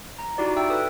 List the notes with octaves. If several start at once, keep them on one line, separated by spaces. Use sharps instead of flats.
A#5
D#4 E4 F#4 G4 D5
E5 G5 E6
A4 B4 D#6 E6